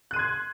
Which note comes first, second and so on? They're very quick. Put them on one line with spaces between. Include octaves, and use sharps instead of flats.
F#6 D#7 C6 G#6